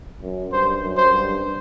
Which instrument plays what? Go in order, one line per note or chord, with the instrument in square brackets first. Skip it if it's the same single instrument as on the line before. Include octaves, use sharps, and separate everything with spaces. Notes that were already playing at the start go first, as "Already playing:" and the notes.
[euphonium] F#2
[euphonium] G2 [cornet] C5
[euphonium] F#2
[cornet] C5
[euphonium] G2